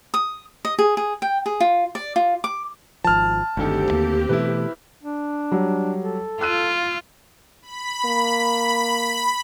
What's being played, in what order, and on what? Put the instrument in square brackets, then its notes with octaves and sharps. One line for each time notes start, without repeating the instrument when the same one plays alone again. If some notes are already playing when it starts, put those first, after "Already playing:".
[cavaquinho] D#6
D#5
G#4
G#4
G5
G#4
F4
D5
F4
D6
[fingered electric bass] G#1 F3 [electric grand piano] A5 F6
[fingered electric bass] G1 D3 D#3 [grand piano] D2 A4 [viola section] C4 G4
[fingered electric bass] D#2 A#3
[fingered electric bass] B2 E3 A3 [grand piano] E4 B4
[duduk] D4
[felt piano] F#3 G3
[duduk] A4
[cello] F4 [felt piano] E6 F#6 D#7
[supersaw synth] B5
[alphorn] A#3